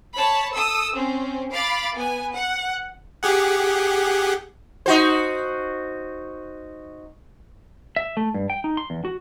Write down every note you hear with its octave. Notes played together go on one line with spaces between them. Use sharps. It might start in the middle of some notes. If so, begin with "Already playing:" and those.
C#5 A5 B5
A4 D#6 E6
C4 C#4
F5 B5 D6 A6
B3 G#5
F#5
G4 G#4 F#5
D#4 F#4 C5
E5
A3
G2
G5
D#4
C6
E2
F#4